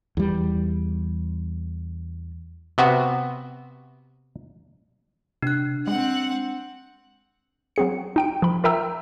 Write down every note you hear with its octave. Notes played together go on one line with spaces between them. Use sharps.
E2 G3
C3 B3 F#4
C3 D4 F#6
G#3 C4 F#5
F#3 C4 G#4 C#7
D#4 G5 D7
F3 B5
F4 A#4 E5 G5 A#5 E6